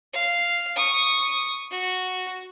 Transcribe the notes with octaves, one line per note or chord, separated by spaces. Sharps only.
F5
C#6 D#6
F#4